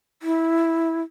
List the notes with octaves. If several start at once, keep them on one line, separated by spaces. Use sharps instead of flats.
E4